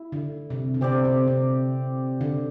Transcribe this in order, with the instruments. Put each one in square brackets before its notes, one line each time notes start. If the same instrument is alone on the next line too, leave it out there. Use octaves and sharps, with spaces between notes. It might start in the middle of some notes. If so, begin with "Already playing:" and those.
Already playing: [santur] E4
[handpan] D3
C3
D3
[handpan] C3 [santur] C4 G4 D5
[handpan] C3
C3
D3